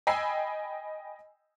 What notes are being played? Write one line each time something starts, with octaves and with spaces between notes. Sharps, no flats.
D#5 G5 G#5 B5 E6 C7